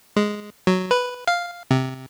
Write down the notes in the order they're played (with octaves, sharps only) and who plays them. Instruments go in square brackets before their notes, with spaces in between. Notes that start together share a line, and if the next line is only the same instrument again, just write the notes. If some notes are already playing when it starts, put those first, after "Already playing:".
[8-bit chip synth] G#3
F#3
B4
F5
C3